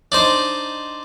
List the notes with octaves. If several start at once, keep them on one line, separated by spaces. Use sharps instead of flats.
D4 D#4 C5